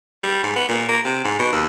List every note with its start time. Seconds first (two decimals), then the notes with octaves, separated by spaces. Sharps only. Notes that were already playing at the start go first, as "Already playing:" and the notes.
0.23 G3
0.43 G#2
0.56 B3
0.69 A#2
0.89 A#3
1.05 C3
1.24 G#2
1.39 B2
1.52 D#2